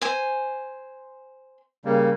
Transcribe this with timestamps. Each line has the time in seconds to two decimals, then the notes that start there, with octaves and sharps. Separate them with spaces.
0.01 C5 G#5
1.85 C#3 G3 A#3